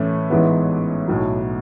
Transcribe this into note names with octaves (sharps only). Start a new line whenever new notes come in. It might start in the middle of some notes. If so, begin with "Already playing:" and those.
Already playing: A2 E3 A3 C#4 E4
A1 G#2 E3 B3
B1 A2 F#3